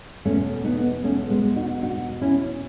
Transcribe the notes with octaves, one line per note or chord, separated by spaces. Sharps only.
E2 B2 A3 C#4
B3 D#4
A3 C#4
G#3 B3
D#4 F#4
D#4 F#4
C#4 E4